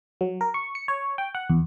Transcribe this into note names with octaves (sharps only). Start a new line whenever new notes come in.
F#3
A#4
C#6
C#7
C#5
G5
F#5
E2